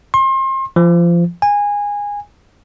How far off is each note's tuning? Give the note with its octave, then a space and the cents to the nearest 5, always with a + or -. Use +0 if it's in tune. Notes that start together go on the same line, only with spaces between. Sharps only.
C6 +35
F3 -25
G#5 -20